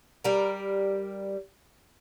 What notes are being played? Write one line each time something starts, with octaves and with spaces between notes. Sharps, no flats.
G3 A#4